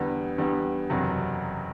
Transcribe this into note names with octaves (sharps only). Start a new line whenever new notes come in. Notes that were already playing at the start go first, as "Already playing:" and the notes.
Already playing: E2 D3 G3 B3
E2 D3 G3 B3
F#1 E2 C3 F#3